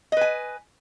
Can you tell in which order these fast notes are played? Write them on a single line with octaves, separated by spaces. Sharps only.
D#5 B4 G#5